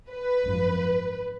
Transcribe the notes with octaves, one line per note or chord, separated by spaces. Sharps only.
B4
G#1 F#2 F3